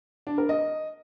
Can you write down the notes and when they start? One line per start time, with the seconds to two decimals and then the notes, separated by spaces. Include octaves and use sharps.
0.27 D4
0.38 A#4
0.49 D#5